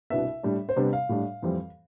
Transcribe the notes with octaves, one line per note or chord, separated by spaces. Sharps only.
C2 B2 B3 D4 E5
A2 G3 D4
C5
C3 G3 B3 D4 D5
F5
A2 G3 D4
F2 E3 G3 C4